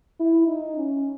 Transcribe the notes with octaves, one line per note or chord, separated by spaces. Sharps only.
E4
D#4
C#4